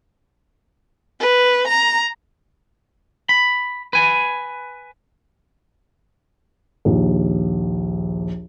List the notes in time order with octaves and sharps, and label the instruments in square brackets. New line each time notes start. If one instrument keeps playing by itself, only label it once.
[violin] B4
A#5
[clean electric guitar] B5
B4 G#5
[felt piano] A#1 D#2